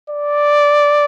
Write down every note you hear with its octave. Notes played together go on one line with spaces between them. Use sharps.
D5